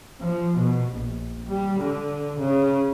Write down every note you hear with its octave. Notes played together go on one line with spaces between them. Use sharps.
F3
B2
A#1
G3
D3
C#3